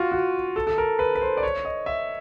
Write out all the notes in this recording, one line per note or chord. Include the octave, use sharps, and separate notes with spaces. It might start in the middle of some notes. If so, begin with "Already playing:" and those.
Already playing: F4 F#4
F#4
A4
A4
A#4
B4
B4
C5
D5
C#5
D#5
E5